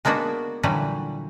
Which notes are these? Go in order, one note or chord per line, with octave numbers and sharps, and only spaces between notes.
G#3 A#3 B3 D4 F#4
A#2 D3 E3 F#3 G3 B4